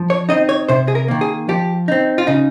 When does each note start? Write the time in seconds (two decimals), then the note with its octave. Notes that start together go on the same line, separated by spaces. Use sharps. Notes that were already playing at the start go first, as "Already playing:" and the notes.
Already playing: F3
0.10 C#5
0.29 C4 D#4 D#5
0.49 C#5
0.69 C3 C5
0.88 G#4
0.95 A#4
1.08 D#3 A#3
1.21 G#4
1.49 F3 G4
1.88 C4 D#4
2.18 F4
2.27 C#3 D#4